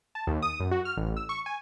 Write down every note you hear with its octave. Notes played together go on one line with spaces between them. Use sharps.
A5
D#2
D#6
F#2
F#4
F6
A1
E6
C#6
G#5